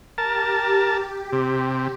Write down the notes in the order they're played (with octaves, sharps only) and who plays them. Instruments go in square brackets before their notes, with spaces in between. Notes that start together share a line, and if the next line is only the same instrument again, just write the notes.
[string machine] G4 [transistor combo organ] A#4 A5
[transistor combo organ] C3